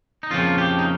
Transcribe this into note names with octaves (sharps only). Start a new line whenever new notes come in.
D#4
F2 C#3 F3 A#3 F4
G4
D#4